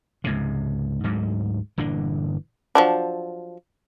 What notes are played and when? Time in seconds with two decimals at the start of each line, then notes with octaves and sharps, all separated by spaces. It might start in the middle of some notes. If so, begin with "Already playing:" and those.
0.24 C#2 G#2 C3
1.04 D2 G#2 F#3
1.78 G1 A#2 E3 D4
2.75 F3 F#3 D4